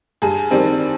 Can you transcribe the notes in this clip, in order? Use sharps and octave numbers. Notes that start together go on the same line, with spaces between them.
G2 G#4
D#3 G3 C4